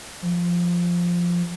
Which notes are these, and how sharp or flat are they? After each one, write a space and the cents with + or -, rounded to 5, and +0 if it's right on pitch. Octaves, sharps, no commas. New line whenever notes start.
F3 +0